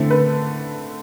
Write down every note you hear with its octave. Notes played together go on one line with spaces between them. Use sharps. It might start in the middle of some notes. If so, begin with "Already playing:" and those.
Already playing: D3 A3 C4 E4 A4
B4